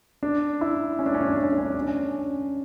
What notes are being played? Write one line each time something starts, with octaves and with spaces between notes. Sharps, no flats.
D4
E4
C#4
D4
C#4
D4
C#4
D4
C#4
D4
C#4
D4
C#4
D4
C#4